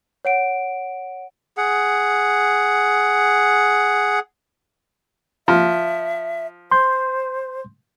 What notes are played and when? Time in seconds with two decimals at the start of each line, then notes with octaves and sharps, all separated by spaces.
0.25 C#5 F#5 D7
1.57 G#4 F#5
5.48 F3 E5
6.71 C5 C6 G6